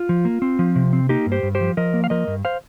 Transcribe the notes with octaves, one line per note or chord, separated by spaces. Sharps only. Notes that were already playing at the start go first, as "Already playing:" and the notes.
Already playing: F4
F3
A#3
C4
F3
C3
C4
A#3 D#4 G4
G2
G4 C5
G2
G4 C5
F3
F3 A#4 D#5
A#3
F5
F3 A#4 D#5
G2
C5 F5